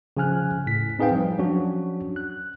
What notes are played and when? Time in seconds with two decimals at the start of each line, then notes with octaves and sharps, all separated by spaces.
0.17 C#3 F3 G#5 F6 F#6
0.67 A2 B6
0.99 C4 D#4 G#4 B4 F5 G5
1.11 F3 G3
1.38 F3 F#3 C#4 D4 F#4
2.16 F#6